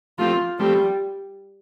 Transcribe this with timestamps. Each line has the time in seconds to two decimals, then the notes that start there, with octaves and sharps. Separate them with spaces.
0.18 F3 A3 C4 F4 G4
0.59 F3 G3 A3 C4 G4